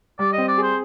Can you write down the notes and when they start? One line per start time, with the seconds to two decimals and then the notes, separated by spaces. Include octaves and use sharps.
0.19 G3 D5
0.33 D#5
0.38 C4
0.48 D5
0.58 G#4 C5